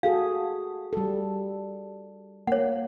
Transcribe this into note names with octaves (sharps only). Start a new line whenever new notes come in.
F#4 G#4 A4 F5
G3 A4
A#3 C#5 F#5